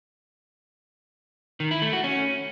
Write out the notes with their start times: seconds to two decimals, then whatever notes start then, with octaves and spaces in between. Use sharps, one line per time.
1.60 D#3
1.71 E4
1.82 A3
1.93 F#4
2.04 C#4